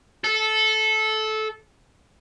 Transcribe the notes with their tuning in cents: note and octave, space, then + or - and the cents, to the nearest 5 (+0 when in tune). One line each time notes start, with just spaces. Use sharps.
A4 -15